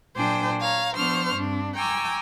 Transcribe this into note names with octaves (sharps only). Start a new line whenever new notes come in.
A#2 F#3 D4 C5 G5 G#5
C#5 F5 A#5
F3 B3 D4 C5 C#6 F6
G2 C4 D4
G5 G#5 A#5 C#6 D6 E6